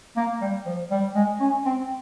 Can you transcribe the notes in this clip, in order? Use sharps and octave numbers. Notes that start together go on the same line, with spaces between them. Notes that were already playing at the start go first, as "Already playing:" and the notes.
A#3
G3
F3
G3
G#3
C#4
C4